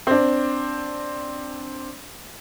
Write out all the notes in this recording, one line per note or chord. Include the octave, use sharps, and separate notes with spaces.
C4 D4